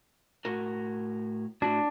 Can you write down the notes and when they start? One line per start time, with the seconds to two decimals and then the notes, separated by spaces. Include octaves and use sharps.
0.45 A2 F#4 A#4
1.62 A2 D4 E4 F#4